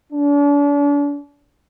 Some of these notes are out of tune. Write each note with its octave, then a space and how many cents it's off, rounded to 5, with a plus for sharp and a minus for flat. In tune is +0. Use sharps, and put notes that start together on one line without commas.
D4 -40